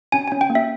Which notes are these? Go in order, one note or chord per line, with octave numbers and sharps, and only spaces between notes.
C#4 G#5
C#4 G#5
G5
A#3
E5